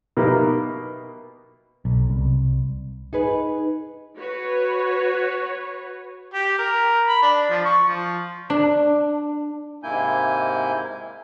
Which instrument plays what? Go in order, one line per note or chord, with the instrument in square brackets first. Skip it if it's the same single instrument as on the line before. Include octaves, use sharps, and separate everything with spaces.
[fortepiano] B2 A#3 D#4 G4 E5
[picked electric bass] B1
C2
[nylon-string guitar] D#4 G#4 B4
[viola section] F#4 B4 C#5
[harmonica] G4
A#4
B5
D4
F3
C#6
F3
[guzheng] D4
[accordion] G#2 C3 A#3 E4 G#5 G6